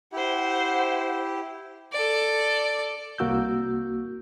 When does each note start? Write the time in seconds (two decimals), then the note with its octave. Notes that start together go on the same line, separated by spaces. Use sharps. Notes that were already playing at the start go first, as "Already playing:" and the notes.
0.13 E4 G4 C5 F#5
1.92 A4 D5
3.18 C2 A#3 F#4 E6 G6